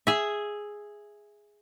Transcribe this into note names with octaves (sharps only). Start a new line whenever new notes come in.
G#4 E5